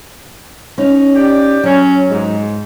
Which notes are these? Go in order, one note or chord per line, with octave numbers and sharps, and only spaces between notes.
C#4 D#4
G4 D5 G5
F#3 C#4
G#2